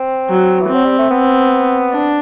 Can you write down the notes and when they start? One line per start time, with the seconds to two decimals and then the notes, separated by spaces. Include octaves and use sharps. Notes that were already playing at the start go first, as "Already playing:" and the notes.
Already playing: C4
0.29 F#3
0.61 E3
0.69 F#3 C4
0.86 G3
0.99 A3
1.11 B3 C4
1.92 D4